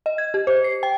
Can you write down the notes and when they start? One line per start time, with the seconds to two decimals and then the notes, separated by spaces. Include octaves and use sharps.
0.06 D#5
0.18 G#6
0.34 G4
0.47 C5
0.64 C7
0.83 G5